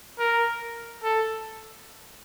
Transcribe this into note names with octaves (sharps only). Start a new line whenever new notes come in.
A#4
A4